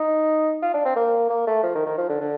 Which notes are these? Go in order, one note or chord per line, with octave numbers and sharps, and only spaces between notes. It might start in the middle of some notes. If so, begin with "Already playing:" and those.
Already playing: D#4
F4
D4
C4
A#3
A#3
A3
F3
D#3
D#3
F3
D3
D3